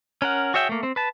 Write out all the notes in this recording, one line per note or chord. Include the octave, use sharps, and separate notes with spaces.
C#4 A#4 F#5
F#4 G#4 C#5 E5 G5
A3 A#3
C4
B4 A5